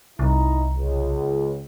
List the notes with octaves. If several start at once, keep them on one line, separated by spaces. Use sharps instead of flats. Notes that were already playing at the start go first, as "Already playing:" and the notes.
C2 D#4 E4 A#5
C#2